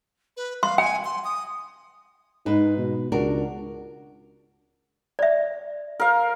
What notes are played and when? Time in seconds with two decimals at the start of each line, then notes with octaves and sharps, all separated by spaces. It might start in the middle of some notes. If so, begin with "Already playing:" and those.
0.37 B4
0.63 F5 C6
0.78 G5 G#5
1.04 C6
1.24 D#6
2.46 G#2 D#4 B4
2.77 B2
3.12 C#2 D4 F#4 A#4
5.19 D5 E5
6.00 A#4 F5